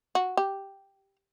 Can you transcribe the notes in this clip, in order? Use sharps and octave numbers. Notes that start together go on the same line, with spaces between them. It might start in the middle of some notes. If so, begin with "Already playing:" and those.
F#4
G4